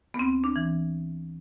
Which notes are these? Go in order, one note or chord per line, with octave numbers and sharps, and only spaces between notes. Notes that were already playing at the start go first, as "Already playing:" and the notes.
B3
D2 C4
D4
E3